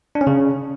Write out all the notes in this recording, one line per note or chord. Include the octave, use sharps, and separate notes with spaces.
D4
C#4
C#3